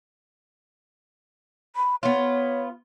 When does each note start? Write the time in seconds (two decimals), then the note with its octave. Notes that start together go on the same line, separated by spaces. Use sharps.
1.76 B5
2.03 B3 F4 C#5